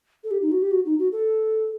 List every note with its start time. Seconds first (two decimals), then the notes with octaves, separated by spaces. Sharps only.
0.24 A4
0.31 G4
0.42 D#4
0.52 F#4
0.62 G4
0.71 F#4
0.86 D#4
0.99 F#4
1.12 A4